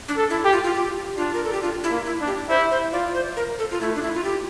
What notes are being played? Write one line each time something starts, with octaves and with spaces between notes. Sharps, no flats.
D4
A4
E4
G4
F4
F4
G4
D4 F4
A#4
A4
G4
D4 F4
E4
A#3
E4
D4
G4
E4 C5
C5
F4 D5
C5
A#4
A4
F4
A3 E4
D4
E4
F4
G4